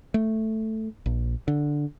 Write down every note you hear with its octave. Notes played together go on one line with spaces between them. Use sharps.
A3
A#1
D3